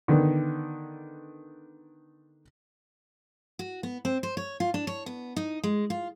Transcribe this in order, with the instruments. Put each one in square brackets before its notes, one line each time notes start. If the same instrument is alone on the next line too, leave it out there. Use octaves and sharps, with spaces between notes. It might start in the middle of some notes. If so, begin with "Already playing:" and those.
[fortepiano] D3 D#3 B3
[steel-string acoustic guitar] F#4
B3
C4
C5
C#5
F4
D4
C#5
B3
D#4
G#3
F4